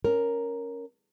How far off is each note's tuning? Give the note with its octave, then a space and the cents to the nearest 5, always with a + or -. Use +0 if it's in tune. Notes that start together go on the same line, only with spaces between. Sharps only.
C#4 +0 A#4 +0